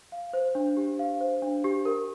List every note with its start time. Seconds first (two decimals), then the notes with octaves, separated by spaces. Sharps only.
0.12 F5
0.33 C5
0.55 D4
0.77 G4
0.99 F5
1.21 C5
1.42 D4
1.64 G4
1.85 A#4